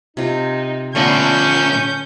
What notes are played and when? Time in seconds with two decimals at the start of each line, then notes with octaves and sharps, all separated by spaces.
0.17 C3 D#4 F4
0.95 A#2 D3 A3 B3 C#4 D4 G6